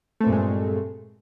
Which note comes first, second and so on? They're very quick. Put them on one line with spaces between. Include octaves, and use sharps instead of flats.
A3 C4 A#2 G2 G#3